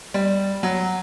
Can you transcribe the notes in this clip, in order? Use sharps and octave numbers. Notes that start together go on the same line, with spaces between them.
G3
F#3